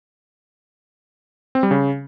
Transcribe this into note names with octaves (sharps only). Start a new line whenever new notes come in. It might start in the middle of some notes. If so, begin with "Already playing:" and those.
C4
G3
C#3